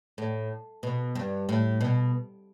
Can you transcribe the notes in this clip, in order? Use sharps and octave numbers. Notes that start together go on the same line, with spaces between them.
A2
B2
G2
A2
B2